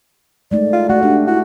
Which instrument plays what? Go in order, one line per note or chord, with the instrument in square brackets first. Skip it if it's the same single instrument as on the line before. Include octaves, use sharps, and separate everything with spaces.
[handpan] G#3 A3 D#4 [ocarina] D5
[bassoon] F4
[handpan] A3 [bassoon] F#4
[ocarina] D4 [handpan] G4
[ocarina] E4 [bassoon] F#4